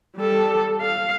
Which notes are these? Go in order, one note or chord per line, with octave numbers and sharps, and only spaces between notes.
G3 A4
F5